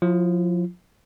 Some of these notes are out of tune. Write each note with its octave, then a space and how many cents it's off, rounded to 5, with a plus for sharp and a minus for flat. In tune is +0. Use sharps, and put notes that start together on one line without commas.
F3 +35 F4 -45